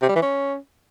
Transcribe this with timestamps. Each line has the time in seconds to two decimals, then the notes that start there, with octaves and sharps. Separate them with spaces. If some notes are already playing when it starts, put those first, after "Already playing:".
0.02 C3
0.09 G3
0.15 E3
0.22 C#4